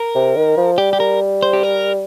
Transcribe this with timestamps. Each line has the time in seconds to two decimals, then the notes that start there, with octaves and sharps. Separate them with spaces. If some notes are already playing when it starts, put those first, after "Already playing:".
Already playing: A#4
0.15 C3
0.36 D#3
0.57 F3
0.78 G3 G4
0.93 G4
1.00 A#4
1.43 C5
1.53 G4
1.63 A#4